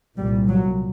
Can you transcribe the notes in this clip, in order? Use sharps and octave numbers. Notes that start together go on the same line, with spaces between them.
C2 A#2 G3
F#3